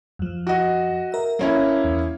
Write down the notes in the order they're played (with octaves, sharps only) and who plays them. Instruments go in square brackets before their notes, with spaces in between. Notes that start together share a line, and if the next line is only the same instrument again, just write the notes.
[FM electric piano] F2 F3
[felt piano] F#4 D#5
[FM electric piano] A#4 E5
[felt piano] A#3 C#4 E4
[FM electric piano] E2